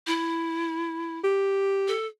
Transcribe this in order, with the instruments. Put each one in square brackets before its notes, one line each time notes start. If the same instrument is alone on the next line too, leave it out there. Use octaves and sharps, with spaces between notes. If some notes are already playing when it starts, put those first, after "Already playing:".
[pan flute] E4
[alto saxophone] G4
[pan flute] A4